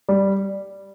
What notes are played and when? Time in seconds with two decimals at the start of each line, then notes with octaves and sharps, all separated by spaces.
0.09 G3